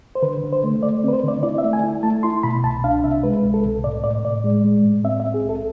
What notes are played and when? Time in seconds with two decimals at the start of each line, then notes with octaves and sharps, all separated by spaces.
0.15 C5
0.22 D3 B4
0.43 D3
0.53 C5
0.64 A3
0.83 A3 D5
1.04 C4 B4
1.13 C5
1.24 D3 D5
1.43 E4 D5
1.58 E5
1.64 A3
1.73 G#5
1.84 E4
2.03 A3 A5
2.23 E4 C6
2.43 B2 B5
2.64 C2 A5
2.84 D4 F5
3.04 C3 E5
3.23 G#3 B4
3.45 C2
3.54 A4
3.65 C3
3.84 A2 D5
4.04 A2 D5
4.24 A2 D5
4.44 G#3
4.64 G#3
4.84 A2
5.04 C4 E5
5.20 E5
5.25 C4
5.34 G#4
5.44 C2
5.49 A4